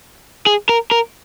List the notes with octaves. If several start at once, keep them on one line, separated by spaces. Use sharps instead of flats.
G#4
A#4
A#4